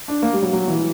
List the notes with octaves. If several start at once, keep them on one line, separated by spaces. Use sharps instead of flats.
D4
A#3
G3
F#3
F#3
E3